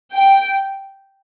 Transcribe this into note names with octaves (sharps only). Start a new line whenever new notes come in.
G5